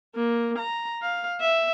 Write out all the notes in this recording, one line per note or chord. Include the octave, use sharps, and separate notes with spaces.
A#3
A#5
F5
E5